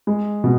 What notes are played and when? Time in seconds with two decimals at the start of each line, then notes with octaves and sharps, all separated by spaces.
0.07 G#3
0.44 B2